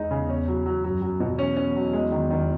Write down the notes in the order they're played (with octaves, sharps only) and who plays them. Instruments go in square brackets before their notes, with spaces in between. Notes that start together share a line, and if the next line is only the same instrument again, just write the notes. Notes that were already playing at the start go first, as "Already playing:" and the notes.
Already playing: [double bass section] E2 [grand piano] G#3 D#4
[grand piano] C#3
C#4
F#3
F#3
[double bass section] F#2 [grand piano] F#3
[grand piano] F#3
B2
[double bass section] E2 [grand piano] C#4
[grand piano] C#4
F#3
G#3
D#3
D#3